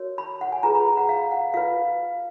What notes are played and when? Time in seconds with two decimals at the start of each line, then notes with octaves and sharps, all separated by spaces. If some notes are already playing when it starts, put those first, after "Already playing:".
Already playing: F#4 A#4 C#5
0.18 B5
0.41 F#5
0.52 G#5
0.63 F4 G#4 B4 A#5
0.75 B5
0.86 A#5
0.97 F#5
1.09 F5
1.31 F#5
1.54 F4 B4 F5